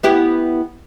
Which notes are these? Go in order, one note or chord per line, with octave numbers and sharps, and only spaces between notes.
B3 E4 G4